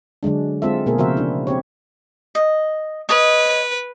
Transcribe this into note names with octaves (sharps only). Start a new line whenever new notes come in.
D3 F#3 G#3 D4
G#3 C4 F4 A4 E5
B2 A#3 G#4 A#4
C#3 F3 F#4 A#4 C5 E5
D4 E4
C4 G4 C#5
D#5
B4 C#5 D#5